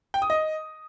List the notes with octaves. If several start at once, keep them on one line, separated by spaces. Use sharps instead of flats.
G5
D#6
D#5